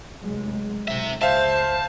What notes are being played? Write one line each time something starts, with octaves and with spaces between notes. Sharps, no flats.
F1 F#3 G#3
B1 G#2 C3 E5
C#2 C5 E5 F5 A5